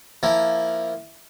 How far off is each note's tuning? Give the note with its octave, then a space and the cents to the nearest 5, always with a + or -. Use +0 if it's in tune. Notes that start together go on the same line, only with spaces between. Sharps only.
F3 -5 A#3 +0 E4 +0